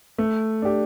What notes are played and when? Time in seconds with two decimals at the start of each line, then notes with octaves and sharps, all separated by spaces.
0.18 A3
0.62 D4 G4